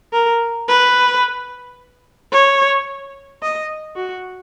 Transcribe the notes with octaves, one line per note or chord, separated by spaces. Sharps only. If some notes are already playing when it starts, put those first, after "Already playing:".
A#4
B4
C#5
D#5
F#4